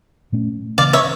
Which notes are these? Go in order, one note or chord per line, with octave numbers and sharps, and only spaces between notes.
A#2 A3 C#4
C#3 E3 A#3 D5 F5
C#5 E5